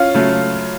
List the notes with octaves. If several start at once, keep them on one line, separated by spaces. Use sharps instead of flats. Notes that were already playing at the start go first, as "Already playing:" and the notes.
Already playing: C#4 F4
C#3 F#3 A3